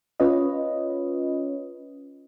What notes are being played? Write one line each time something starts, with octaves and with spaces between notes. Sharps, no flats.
C#4 F4 B4 C#5 D#5